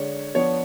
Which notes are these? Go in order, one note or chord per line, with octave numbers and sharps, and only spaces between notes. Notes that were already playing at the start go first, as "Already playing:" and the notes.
Already playing: D3 G#3 D4 C#5
F3 B3 D4 C#5